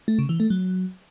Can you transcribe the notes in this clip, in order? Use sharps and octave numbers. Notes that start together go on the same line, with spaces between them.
A3
C#3
E3
A3
F#3